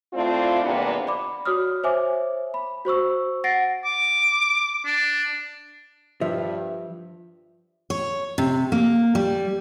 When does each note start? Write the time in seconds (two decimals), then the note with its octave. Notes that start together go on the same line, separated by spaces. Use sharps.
0.13 A3 C4 D4 E4 F4
0.62 E2 G#2 C3 A#3 B3 D4
1.07 D5 B5 D6
1.45 F#4 C#5 D#6 F6
1.84 C5 C#5 E5 G#5 D6
2.54 B5
2.85 F#4 C5 C#6 E6
3.44 F#5 A6 A#6 C7 D7
3.85 D6
4.86 D4
6.21 G2 F3 E5
7.90 C#5
8.38 C3
8.72 A#3
9.15 G3